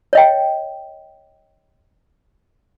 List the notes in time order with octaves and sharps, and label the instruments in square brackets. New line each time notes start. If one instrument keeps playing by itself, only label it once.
[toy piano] C#5 D#5 G5